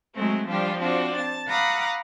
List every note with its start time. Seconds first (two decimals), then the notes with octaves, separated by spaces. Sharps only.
0.14 F#3 G#3 A3 C4
0.48 F3 G3 D4 F4 G4
0.80 C4 D4 F4 F#4
1.16 A5 A6
1.49 F5 F#5 A#5 B5 D6 D#6